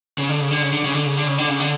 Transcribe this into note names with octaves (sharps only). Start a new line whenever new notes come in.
C#3
D3
C#3
D3
C#3
D3
C#3
D3
C#3
D3
C#3
D3
C#3
D3